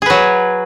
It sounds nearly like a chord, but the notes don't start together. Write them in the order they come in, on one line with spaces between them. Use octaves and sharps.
G#4 B4 F#3